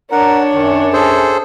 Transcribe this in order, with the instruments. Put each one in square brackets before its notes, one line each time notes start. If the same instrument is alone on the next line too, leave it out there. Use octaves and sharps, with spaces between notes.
[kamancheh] D4 C#5 [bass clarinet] A#4 [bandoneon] F#5
[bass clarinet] F#2 [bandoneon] D#3
[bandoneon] G#4 A4 C5